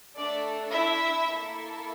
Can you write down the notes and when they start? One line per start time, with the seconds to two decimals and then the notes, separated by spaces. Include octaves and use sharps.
0.17 A3 D4 A4 D5
0.73 E4 E5
1.29 A#3 E4 A4